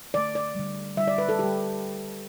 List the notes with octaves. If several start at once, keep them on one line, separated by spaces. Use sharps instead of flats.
D3 A3 D5
D5
D3 G3
D3 G3 E5
D5
B4
A4
D3 G3 G4